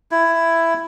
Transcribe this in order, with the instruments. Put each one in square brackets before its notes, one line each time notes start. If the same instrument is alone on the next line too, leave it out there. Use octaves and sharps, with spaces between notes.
[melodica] E4